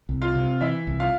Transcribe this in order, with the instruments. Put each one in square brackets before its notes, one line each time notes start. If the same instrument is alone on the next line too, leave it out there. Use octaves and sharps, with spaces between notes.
[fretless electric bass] C2
[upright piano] F4 F5
[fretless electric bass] C3
[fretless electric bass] E3 [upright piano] E4 E5
[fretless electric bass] C2
[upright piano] F4 F5